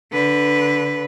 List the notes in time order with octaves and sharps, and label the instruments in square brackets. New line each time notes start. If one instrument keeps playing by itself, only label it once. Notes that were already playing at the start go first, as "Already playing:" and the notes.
[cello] D3 B4